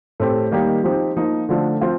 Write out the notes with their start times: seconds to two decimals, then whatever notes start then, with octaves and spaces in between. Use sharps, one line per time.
0.20 A2 A3 C4 G4
0.51 D#3 G3 A#3 D#4 G4
0.84 F3 C4 D#4 G4
1.17 F3 A#3 D#4
1.49 D3 F3 A3 D4
1.81 F3 C4 F4